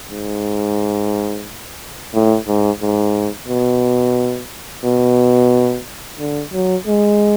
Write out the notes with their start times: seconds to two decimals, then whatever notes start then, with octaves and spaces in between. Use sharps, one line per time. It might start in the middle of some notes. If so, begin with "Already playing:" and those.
0.10 G#2
2.14 A2
2.47 G#2
2.81 G#2
3.48 B2
4.84 B2
6.19 D3
6.52 F#3
6.87 G#3